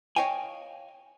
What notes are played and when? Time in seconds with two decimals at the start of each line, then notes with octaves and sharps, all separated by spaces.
0.16 C#5 D#5 F5 G5 G#5